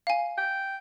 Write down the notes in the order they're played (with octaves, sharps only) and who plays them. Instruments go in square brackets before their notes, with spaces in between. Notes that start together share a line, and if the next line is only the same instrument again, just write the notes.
[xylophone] F5 G#5
[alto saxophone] G5